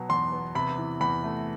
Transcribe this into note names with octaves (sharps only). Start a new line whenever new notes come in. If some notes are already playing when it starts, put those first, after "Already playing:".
Already playing: B2 F#3
E2 C6
B3
C3 B5
E3
E2 B5
A3